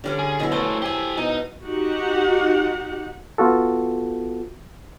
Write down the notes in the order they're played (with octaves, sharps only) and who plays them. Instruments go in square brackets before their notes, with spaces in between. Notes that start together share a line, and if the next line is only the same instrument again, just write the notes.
[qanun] D3 G3 C#4
[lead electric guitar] G#4
[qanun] B2 F#3 E4
[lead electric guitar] C#3 A3 [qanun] C5
[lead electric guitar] G4 G#5 [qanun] E5 A5
[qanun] B2 [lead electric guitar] D#4
[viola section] D#4 F#4 G4 F#5
[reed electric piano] B3 F4 F#4 A4